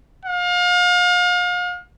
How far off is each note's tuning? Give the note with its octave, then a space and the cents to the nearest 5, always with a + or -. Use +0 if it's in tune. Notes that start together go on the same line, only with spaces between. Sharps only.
F5 +35